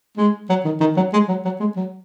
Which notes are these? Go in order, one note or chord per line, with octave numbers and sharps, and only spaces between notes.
G#3
F#3
D#3
D#3
F#3
G#3
F#3
F#3
G#3
F#3